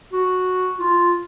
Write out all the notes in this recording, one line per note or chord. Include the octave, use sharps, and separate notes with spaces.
F#4
F4